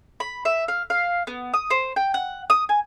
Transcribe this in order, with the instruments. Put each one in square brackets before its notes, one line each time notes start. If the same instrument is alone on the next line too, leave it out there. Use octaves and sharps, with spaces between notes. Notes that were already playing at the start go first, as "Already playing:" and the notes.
[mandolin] B5
E5
F5
F5
B3
D#6
C5
G5
F#5
D#6
G#5